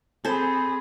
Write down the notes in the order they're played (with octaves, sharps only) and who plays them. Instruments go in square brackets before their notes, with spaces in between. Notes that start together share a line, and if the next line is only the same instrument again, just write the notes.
[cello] C4 G#4 [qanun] A4 C5 [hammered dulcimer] G#5 B5